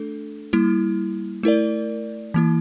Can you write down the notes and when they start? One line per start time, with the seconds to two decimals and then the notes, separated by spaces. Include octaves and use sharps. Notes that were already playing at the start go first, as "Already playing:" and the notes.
Already playing: A3 D4 A4
0.53 G3 A#3 E4
1.43 A3 E4 A#4 D5
2.34 E3 A#3 E4